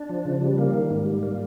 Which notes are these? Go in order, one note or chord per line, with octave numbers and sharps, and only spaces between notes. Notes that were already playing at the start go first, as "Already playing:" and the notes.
Already playing: D4
F3
C#3
G3
A#3
D#3
G#2
G3
A#3